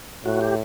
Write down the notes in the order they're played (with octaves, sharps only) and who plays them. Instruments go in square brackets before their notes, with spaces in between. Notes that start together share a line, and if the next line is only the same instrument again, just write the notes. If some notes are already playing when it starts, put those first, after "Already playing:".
[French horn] A2 [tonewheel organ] F#4
[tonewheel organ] G4